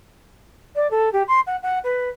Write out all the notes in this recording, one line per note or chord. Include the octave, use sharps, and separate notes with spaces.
D5
A4
G4
C6
F#5
F#5
B4